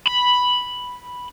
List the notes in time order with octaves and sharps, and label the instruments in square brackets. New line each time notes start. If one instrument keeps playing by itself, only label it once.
[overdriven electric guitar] B5